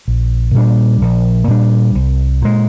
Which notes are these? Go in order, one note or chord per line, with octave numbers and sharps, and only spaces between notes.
A#1
A#2 G3 D4
A#1
A#2 G3 D4
C2
A#2 G#3